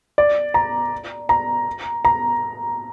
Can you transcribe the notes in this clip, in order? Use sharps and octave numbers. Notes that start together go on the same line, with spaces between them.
D5
A#5
A#5
A#5